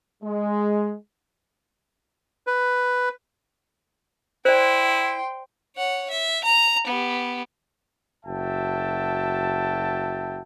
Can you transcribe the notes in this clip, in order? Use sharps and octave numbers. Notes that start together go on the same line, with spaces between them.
G#3
B4
E4 C5 D5 G5 C6
C#5 F#5
E5
A#5
B3 G4
F#1 F#4 E5 G5 A5